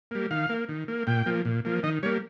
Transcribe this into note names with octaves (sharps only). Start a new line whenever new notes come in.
G3 A#3
D#3 F5
A#3
D#3
A#3
A#2 G5
F3 A#3
A#2
F3 A#3
D#3 D#5
G3 A#3 C#5